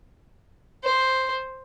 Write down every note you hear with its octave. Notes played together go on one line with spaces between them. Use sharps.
C5